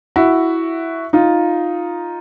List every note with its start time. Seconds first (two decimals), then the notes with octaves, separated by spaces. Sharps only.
0.16 E4 F#4
1.13 D#4 F4